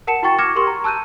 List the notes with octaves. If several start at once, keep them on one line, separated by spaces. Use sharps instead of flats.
A#4 F#5 A5 C#7 E7
E4 F#4 G5 C#6 A6
D6 F6 G#6 A#6 C#7 E7
G4 A#4 C6 C#6
A#5
A5 E6 F#6 G6 D#7